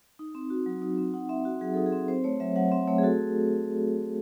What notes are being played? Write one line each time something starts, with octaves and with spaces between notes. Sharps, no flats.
D#4
C4
F#4
F#3
D#4
C4
D#4 F#5
C4 E5
F#4
F#3 G#4
D#4 A4
G#4
C4
C4 C5
A3 C#5
F#3 E5
F#3 F#5
C4 E5
A3 C#5
G#4
F#4 A4